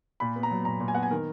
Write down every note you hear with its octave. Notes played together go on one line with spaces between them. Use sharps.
A#2 B5
B3
A#5
F#3
A#2 A#5
A#2
G#5
B3 F#5
G#5
D#3 A#4